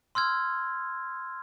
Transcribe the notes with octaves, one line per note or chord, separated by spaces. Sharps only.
C6 E6 F6 G#6